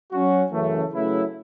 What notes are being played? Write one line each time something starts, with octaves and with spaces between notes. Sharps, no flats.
F#3 C#4 F#4
F#2 C#3 E3 A3
C#3 F#3 A3 E4 B4